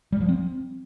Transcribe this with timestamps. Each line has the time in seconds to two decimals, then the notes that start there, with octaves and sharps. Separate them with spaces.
0.12 G3
0.21 F3
0.29 C4